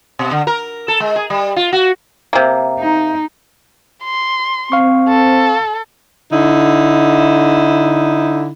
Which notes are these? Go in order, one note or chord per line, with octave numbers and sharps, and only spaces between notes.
B2
D3
A#4
A4
G#3
G#4
G3
F4
F#4
C3 A#3
D#4
C6
C4 F5 C#6
A4
D3 D#4 E4